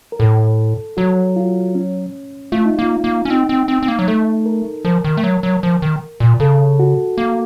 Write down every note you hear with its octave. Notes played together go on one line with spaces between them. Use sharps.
A#4
A2 A4
F#3 F#4
F4
C#4
A3 F4
D#4
A#3 F4
A#3
C#4
C4 D#4
C4
C4
C4
A#3
F#3
A3 A4
A#4
F3 A#4
D#3
A3
F#3
F#3
F3
D#3
A#2
C#3 A4
F#4
A#3